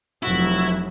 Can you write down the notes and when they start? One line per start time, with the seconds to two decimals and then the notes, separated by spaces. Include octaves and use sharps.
0.23 F1 F#3 E4 F#4 E6